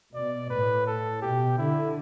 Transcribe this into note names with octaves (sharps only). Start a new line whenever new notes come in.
B2 D5
A2 B4
A4
B2 G4
D3 E4